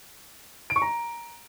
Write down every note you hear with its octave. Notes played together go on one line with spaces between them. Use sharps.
D7
C#6
A#5